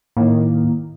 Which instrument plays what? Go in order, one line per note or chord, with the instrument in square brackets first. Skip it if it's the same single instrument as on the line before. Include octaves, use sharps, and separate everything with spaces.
[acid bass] A2 [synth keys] D#3 A#3